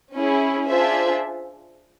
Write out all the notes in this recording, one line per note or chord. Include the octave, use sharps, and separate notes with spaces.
C#4 E4 G#4
D4 F4 G#4 C5 E5